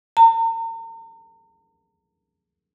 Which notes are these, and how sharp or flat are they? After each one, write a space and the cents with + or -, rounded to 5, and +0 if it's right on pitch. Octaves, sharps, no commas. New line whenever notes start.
A#5 -40